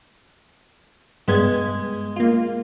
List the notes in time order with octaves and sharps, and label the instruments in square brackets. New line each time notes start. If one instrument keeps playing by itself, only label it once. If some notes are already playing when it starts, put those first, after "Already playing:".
[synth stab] G2 B3 G#6 [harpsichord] G#3
[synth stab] A#3 F4